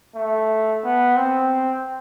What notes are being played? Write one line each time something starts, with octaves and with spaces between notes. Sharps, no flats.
A3
B3
C4